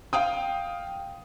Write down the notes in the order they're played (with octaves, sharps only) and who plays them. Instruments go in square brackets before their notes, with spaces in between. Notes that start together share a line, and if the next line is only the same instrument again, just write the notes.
[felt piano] F5 G5 D#6